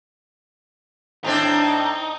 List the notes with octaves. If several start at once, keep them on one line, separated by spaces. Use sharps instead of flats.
A2 C4 D4 D#4